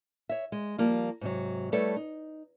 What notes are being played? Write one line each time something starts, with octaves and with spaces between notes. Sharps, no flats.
C#5 E5
G#3
F3 G3 A#3 F4
G#2 C3 F#3
G3 A3 E4 A4 B4 C#5
D#4